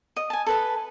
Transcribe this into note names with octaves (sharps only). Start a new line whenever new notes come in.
D#5
G#5 A5
A4 B4 A5